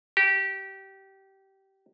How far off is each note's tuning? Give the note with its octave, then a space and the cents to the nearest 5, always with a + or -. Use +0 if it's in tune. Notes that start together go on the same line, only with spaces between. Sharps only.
G4 -20